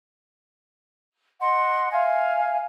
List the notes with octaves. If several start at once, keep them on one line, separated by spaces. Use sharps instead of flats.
D#5 F#5 C6
E5 F5 G#5